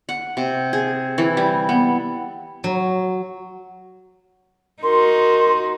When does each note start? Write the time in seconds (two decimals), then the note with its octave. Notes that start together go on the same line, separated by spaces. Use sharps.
0.09 F#5
0.37 C3
0.73 G#4
1.18 E3
1.37 G3
1.69 B3
2.64 F#3
4.83 D#4 F#4 A#4 C6